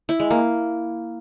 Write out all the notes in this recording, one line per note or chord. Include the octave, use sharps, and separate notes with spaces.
E4
G#3
A#3